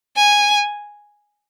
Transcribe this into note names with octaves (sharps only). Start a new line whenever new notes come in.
G#5